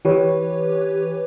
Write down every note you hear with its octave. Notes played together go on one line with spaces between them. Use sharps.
E3 G4 B4 C#5